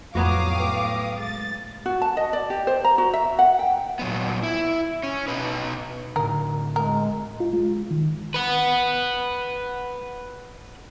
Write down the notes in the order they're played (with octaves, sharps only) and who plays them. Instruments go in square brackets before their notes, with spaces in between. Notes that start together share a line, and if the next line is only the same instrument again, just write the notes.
[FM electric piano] F2 [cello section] A2 [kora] F#3 B3 F#4 [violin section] F5 D6 D#6
[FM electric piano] B4 G5
[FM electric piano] G#3 [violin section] A6
[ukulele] F#4
A5
D#5
D5
G4
C5
A#5
F#4
E5
F#5
G5
[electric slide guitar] A#2 F#3 B3
E4
C#4
B2 D#4 B4
[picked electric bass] A2 D3 [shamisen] A#4
[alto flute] G#3 [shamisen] A#4
[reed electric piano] F4
G#3
D#3
[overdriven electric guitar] B4 F#5